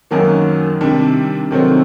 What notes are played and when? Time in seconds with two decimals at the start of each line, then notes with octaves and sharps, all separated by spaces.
0.11 F#2 D#3 F#3 A#3
0.81 C3 D#3 G3 D4
1.51 C3 D#3 F#3 A3 C4